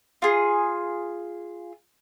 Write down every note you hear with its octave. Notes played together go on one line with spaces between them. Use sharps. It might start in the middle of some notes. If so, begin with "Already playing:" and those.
F4 G#4